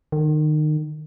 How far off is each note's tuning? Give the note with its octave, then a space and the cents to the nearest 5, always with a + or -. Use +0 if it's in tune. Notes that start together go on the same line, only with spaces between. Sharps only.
D#3 -30